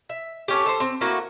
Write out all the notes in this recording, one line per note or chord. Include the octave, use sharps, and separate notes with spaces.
E5
A3 C#4 G4
A4 C5
C4
A3 A#3 E4 F#4